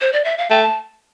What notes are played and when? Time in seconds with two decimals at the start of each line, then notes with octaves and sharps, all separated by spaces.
0.00 C5
0.13 D5
0.24 E5
0.38 F5
0.50 A3 G5
0.62 A5